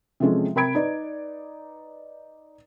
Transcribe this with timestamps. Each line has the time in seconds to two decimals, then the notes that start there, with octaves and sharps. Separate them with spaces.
0.20 C3 E3 F3 G#3 C#4 A4
0.55 C3 A#4 G5 B5 G#6 D7
0.75 D#4 B4 D5